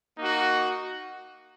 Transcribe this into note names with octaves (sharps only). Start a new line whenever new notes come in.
A#3 D#4 F#4